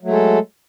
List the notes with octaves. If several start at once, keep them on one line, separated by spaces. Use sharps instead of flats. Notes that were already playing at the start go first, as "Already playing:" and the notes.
F#3 G#3 A3 A4